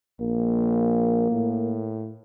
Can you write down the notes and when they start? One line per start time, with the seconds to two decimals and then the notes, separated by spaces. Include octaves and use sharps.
0.21 A#1 A#3
1.31 A2